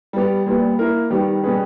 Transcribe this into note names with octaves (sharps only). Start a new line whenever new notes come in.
G3 B3 G4
A#2 G3 B3
A#3 E4 A#4
D#3 G3 B3 G4
B2 G3 C#4 G#4 B4